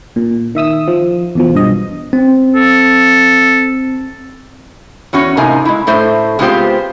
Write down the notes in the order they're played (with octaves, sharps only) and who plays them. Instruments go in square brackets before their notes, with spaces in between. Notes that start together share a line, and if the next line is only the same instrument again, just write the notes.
[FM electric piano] A#2
D#3 E5 D#6 E6
F3
E2 B2 F3
B1 G2 D#5
[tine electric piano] C4
[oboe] A4
[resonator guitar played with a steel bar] E2 C#4 F#4 C#5
A2 C3 A#3 D#4 G#5
G#3 E4
A2 A3 C5 E5
G#3 B3 C4 F4 G4 C5